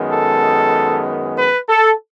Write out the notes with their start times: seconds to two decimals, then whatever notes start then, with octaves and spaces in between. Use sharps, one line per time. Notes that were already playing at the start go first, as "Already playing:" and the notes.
Already playing: F#2 D#3 G#3 B3
0.11 A4
1.37 B4
1.69 A4